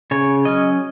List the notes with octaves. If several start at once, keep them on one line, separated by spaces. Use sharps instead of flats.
C#3 C#5
F#3 C#4 D#5